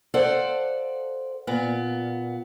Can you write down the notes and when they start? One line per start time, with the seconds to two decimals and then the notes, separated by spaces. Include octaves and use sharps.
0.14 A4 C5 D5 F5 F#5
1.47 A#2 B3